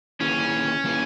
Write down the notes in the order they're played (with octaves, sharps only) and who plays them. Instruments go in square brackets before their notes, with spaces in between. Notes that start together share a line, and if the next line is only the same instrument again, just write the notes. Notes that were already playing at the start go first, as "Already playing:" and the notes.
[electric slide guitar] D#3 A#3 E4 G#4 B4 [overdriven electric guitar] C#4
[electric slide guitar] D#3 A#3 E4 G#4 B4